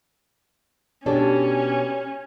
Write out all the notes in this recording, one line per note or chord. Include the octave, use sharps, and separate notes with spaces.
B2 C#4 D4 G4 A4 C#5